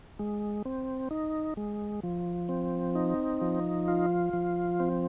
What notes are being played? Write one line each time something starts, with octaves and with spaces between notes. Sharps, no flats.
G#3
C4
D#4
G#3
F3
C4
D#4
F3
F4
F3
C4